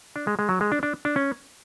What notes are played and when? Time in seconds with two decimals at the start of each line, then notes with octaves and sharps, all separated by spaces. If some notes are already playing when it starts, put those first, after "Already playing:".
0.16 D4
0.27 G#3
0.39 G#3
0.49 F#3
0.61 G#3
0.72 D4
0.83 D4
1.05 D4
1.16 C#4